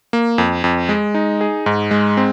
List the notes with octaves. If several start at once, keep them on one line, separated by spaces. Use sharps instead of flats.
A#3
F2
F2
G#3
D#4
G#4
G#2
G#3
C4